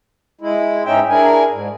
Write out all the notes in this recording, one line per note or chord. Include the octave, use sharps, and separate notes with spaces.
G#3 E4
G#2 C#4 D#4 E5 G5
D4 E4 G#4 A#4 G#5
G#2